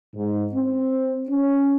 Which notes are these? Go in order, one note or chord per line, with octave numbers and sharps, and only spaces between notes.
G#2
C4
C#4